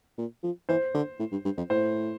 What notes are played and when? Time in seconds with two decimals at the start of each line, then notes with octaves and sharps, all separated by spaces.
0.18 A#2
0.43 F3
0.69 E3 C5
0.94 D3
1.19 A2
1.32 G2
1.45 G2
1.57 F2
1.70 A2 C5